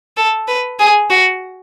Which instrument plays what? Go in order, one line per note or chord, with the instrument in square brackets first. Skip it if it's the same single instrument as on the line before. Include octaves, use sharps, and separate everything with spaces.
[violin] A4
B4
G#4
F#4